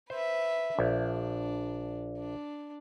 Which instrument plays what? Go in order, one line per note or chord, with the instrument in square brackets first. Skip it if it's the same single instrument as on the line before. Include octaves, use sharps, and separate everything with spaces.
[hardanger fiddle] B4 E5 [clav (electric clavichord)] C5
[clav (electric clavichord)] A#1 [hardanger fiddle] D4
[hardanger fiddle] D4